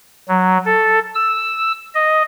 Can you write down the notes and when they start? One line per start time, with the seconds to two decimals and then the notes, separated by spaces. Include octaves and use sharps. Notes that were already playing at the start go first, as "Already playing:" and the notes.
0.28 F#3
0.65 A4
1.15 E6
1.95 D#5